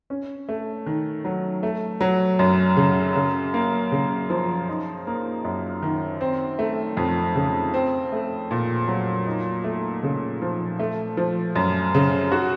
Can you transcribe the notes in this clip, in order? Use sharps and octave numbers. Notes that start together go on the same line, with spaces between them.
C#4
A3
D#3
F#3
A3
F#3
F#2
C#3
C#3
A#3
C#3
F3
D#4
A#3
F#2
D#3
C4
A3
F2
C#3
C4
A3
A#2
F#3
D#4
A3
C#3
F3
A3
F3
F#2
C#3
F#4